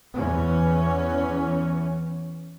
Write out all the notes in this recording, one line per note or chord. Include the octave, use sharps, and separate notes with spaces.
E2 E3 C#4